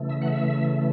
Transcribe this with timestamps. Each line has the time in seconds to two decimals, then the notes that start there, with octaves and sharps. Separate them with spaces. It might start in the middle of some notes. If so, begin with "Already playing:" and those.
Already playing: C#3 E3 A3
0.10 E5
0.22 F#5
0.28 E5